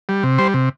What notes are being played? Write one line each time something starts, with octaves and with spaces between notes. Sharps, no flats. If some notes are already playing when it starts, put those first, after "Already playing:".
G3
C3
G3 C5
C3